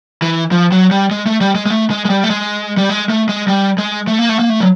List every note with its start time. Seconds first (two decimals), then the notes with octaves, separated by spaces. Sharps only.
0.22 E3
0.52 F3
0.72 F#3
0.91 G3
1.11 G#3
1.26 A3
1.41 G3
1.55 G#3
1.66 G#3
1.70 A3
1.90 G#3
2.05 G#3
2.10 G3
2.24 A3
2.30 G#3
2.78 G3
2.89 G#3
3.10 A3
3.29 G#3
3.48 G3
3.78 G#3
4.08 A3
4.19 A#3
4.29 A3
4.39 A#3
4.50 A3
4.60 F#3